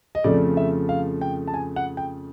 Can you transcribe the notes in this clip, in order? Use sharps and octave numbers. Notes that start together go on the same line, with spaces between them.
D#5
F2 C#3 F3 A3 D5
E5
F5
G5
A5
G#5
F#5
G5